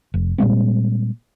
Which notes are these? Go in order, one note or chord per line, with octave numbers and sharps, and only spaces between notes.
F1
A#2 G3 G#3 C4